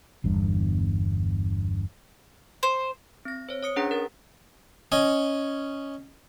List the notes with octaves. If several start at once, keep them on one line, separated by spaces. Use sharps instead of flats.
G1 E2 G2
C5
C4 A#6
C5 C#5
C#5 D#6 C#7
C#4 D4 G#4 B4 F#5 A#5
A#4 A6
C#4 D#5